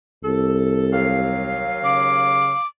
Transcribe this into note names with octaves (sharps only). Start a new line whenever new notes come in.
C2 A4
D#2 F#3 F5
C#3 D6